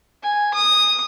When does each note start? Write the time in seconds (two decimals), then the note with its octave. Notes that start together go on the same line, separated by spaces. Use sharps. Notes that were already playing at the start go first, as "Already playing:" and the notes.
0.23 G#5
0.54 D#6